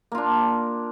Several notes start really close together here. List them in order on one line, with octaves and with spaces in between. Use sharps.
A#3 F4 D4